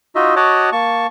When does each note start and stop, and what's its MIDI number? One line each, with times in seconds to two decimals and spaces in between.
0.15 0.35 63
0.15 0.35 65
0.15 0.35 66
0.15 0.35 75
0.15 0.35 76
0.36 0.70 66
0.36 0.70 73
0.36 0.70 75
0.36 0.70 78
0.36 0.70 81
0.36 0.70 86
0.72 1.07 58
0.72 1.07 81
0.72 1.07 85